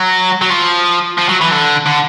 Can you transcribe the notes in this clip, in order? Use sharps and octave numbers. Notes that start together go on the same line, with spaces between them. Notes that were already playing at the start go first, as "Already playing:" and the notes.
Already playing: F#3
F#3
F3
F3
F#3
E3
D3
D3